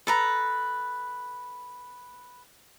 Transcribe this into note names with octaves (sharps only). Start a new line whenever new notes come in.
A4 B4 A#5